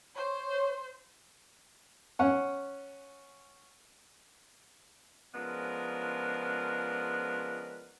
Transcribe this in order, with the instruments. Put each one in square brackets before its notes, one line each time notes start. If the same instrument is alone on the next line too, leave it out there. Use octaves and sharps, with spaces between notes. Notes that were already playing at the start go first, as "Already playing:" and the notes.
[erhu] C5 [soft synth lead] C#5
[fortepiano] C#4 F#5
[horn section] C#3 F3 G#3 B3 D4 A#4